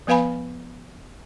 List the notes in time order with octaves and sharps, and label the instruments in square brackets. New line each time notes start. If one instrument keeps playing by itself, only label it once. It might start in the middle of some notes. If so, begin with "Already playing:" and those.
[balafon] F3 B3 B4 F5 G#5 B5